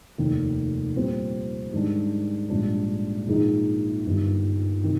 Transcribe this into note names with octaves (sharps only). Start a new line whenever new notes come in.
F1 D#2 D#3
A#2 G3 C4
G#2 D#3 G3 D4 G4
A#1 G#2 G3 D4
A#1 G#2 D#3 G#3 D#4
G1 G2 D#3 G3
C3 D#3